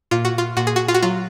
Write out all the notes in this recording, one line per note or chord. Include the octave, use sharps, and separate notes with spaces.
A#2 F4
F#4
F4
A#2 F#4
G#4
F#4
F4
F#4
F#3 F4